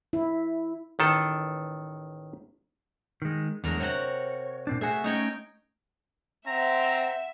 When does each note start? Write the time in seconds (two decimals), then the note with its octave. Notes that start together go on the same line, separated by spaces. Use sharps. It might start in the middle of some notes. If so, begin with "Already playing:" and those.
0.13 E4
0.99 A1 D#3 A4
3.22 D#3 G#3
3.64 E2 D3 F#3 G#3 A#4
3.80 C3 F#4 C#5 F#5
4.67 A#2 C4 D4
4.81 A3 F#4 G#4 E5 G#5
5.04 A3 C#4 D#4 C#5 G5
6.47 C4 E5 F#5 A#5